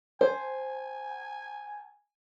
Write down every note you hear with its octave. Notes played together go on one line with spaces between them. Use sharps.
C5 G#5